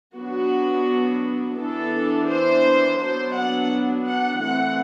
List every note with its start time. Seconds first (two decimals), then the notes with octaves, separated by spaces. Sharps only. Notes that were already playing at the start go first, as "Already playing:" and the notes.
0.16 F#3 B3 D4 F#4
1.57 E3 B3 D4 A4
2.28 C5
2.99 F#3 B3 D4 C5
3.35 F#5
4.06 F#5
4.41 E3 A3 C4 F#5